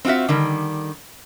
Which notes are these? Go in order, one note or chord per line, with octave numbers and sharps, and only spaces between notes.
C4 D#4 F4 F#4 E5
D3 D#3 G3